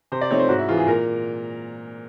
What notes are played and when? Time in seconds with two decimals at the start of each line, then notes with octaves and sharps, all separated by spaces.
0.12 C3 C5
0.21 D5
0.31 F3 A3 C4 D#4 C#5
0.39 C5
0.49 G#2 F#4
0.59 E4
0.69 E3 G#3 F4
0.78 G#4
0.87 A#2 A#4